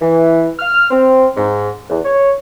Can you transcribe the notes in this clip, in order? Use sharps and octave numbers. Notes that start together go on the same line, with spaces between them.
E3
F6
C4
G#2
E2
C#5